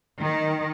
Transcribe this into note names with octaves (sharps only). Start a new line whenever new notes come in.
D#3